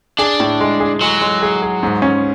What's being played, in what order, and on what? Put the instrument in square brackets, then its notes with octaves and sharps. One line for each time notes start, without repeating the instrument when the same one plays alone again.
[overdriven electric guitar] D4 [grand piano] G#4
[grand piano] A2
G#3
G#4
[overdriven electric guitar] F#3 [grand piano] G#3
[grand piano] G#3
G#4
G#4
G#2
C#4